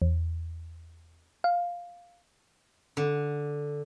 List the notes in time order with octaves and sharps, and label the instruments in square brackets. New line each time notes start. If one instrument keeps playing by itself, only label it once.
[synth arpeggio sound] E2
F5
[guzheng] D3